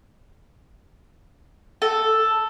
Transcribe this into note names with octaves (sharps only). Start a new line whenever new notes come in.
A4